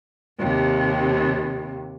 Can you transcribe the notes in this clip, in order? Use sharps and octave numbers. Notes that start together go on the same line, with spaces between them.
D#2 C3